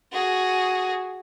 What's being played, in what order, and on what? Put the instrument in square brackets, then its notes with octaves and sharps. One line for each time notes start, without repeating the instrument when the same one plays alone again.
[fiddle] F#4 G#4